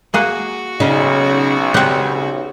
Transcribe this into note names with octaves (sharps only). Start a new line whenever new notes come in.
A#3 F#4 G#4 F#5
B1 C#3 C#4 D#4
C#3 C4 G4 F#5 G5